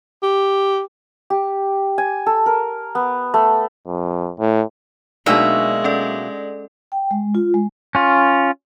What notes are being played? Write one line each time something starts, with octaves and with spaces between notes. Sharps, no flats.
G4
G4
G#5
A4
A#4
B3
A3
F2
A2
B2 F#3 G#3 A#3 D4 D#4 D5 E5
C#4 A4 D5
G5
G#3
F4
G#3
C#4 F4